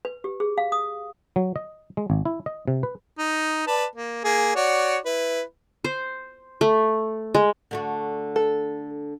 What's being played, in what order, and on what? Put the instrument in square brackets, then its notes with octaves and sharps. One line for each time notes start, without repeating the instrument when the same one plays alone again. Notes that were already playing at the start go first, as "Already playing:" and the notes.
[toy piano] B4
G4
G#4
F5
D#6
[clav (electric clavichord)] F#3
D#5
G#3
G#1
E4
D#5
C3
B4
[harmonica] D#4
B4 D5 A5
A#3
A#3 G#4
F#4 C#5 D5
E4 B4
[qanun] C5
A3
G#3
[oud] D3 A3 F#4
[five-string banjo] A4